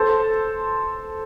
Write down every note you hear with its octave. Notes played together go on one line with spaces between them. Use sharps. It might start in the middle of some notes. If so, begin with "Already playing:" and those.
Already playing: A4 C5